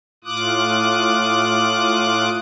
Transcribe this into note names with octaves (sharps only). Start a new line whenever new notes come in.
A2 F4 D6 D#6 F#6